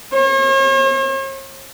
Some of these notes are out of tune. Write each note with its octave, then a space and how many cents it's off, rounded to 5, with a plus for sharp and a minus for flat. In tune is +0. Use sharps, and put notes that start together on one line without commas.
C#5 -45